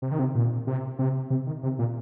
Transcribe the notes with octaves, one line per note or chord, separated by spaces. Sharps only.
C3
D#3
C3
A#2
C3
C3
C3
D#3
C3
A#2